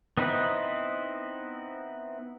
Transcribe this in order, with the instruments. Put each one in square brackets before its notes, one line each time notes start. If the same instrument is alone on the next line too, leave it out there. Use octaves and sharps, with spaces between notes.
[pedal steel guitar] B3 C4 D#4 E4 B4